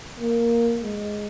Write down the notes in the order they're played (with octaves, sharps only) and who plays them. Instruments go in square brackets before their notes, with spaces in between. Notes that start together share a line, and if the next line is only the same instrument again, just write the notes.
[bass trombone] A#3
G#3